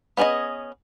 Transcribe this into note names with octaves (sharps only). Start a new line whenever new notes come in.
B3 C#4 G#4 A4 D#5